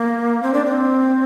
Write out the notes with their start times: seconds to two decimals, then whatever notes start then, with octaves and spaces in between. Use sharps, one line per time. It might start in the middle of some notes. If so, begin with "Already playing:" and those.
Already playing: A#3
0.43 C4
0.53 D4
0.65 C4